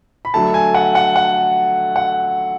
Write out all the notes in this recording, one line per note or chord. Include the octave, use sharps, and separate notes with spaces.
B5
D3 F#3 A3 A5
G#5
F#5
F#5
F#5
F#5